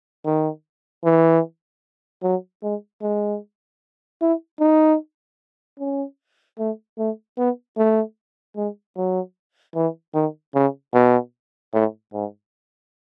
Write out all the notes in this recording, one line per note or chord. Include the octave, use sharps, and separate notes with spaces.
D#3
E3
F#3
G#3
G#3
E4
D#4
C#4
A3
A3
B3
A3
G#3
F#3
E3
D#3
C#3
B2
A2
G#2